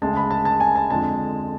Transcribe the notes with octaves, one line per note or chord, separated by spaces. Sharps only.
D2 C#3 G#3 A5
B5
A5
A5
G#5
A5
F2 D3 G#3 A5